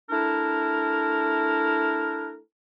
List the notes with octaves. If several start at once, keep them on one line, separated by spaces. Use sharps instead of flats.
A3 D4 E4 A#4